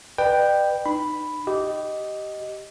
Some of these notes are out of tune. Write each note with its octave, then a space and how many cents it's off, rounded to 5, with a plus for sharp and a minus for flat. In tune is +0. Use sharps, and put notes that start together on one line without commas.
B4 +0 D5 +40 G5 +0
D#4 -25 B5 +0
G4 -15 D#5 +0